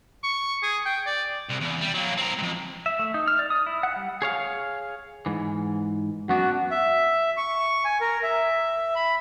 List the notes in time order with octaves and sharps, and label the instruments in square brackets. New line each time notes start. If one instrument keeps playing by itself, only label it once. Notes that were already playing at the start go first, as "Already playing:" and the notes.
[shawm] C#6
G#4
G5
D5
[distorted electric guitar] C2
E2
G3
F#3 A#3
C4 A#4
F2 G#2
[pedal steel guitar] E5
A3
D#4
F6
D5
D#6
E4
F#5
G3
[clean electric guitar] G#4 C#5 F5
G#2 E3
[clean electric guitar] F#2 B3 D4 [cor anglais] F#4
[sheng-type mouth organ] E5
C#6
G#5
A#4
E5
B5